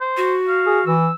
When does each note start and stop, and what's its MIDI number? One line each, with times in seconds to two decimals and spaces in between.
0.01 0.35 72
0.17 0.92 66
0.48 0.82 77
0.66 0.80 68
0.86 1.09 52
0.86 1.15 88